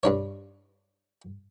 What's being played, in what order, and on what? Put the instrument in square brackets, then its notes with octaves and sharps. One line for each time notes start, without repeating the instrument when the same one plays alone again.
[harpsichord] G2 D4 C#5